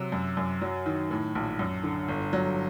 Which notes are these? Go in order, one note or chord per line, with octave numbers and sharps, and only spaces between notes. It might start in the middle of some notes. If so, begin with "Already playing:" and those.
Already playing: C3 F#3
F#2
F#2
F#3
D#3
A2
A#1
F#2
D3
G1
F#3